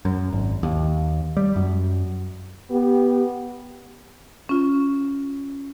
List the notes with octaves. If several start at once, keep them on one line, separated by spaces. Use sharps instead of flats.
F#2
G#1
D#2
G3
F#2
B3 G4
C#4 F4